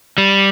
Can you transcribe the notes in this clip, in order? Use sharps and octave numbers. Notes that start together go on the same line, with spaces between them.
G3